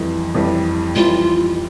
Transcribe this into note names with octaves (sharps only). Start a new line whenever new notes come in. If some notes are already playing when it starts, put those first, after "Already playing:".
Already playing: F2 E3 G3
F2 E3 G3
F2 E3 G3 F4